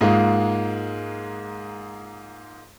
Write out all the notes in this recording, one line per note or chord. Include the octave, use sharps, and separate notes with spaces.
G#2 G#3 A#3 F4